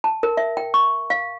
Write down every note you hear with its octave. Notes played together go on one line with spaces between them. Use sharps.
A5
A#4
E5
G5
C#6
F5